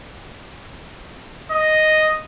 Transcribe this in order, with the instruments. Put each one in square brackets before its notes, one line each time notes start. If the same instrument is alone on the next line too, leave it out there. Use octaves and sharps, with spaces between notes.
[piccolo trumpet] D#5